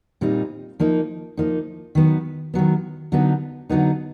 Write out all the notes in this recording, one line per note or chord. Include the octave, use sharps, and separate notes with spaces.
A#2 G3 C4 D#4
F3 A#3 D#4
F3 A#3 D#4
D#3 F#3 B3
D#3 F#3 B3
D3 F#3 B3 D#4
D3 F#3 B3 D#4